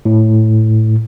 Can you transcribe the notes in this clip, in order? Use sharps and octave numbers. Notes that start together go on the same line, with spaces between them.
A2